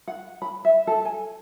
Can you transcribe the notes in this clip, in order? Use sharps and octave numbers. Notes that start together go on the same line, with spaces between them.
F#5
B5
E5
A4
G#5